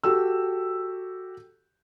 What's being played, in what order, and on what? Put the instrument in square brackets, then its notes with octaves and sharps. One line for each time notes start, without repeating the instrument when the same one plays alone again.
[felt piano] F#4 G4 A4 E6